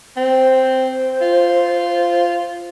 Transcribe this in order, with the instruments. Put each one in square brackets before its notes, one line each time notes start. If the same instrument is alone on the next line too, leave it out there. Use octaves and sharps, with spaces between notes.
[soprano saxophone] C4 [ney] C5
[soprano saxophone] F4